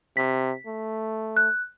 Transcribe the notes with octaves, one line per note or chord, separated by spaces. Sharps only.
C3 B6
A3
F#6